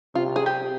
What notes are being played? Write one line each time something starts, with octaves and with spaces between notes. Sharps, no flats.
C3 F4
G#4
G4